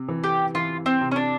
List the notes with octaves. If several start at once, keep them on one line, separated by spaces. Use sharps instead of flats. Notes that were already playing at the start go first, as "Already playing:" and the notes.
Already playing: C3
E3
G4
E3 F4
C4
C3
C#4
D4